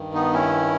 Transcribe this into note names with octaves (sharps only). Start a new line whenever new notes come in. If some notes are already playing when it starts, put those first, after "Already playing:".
Already playing: G2 D#3
B3 D#4
C#4 E4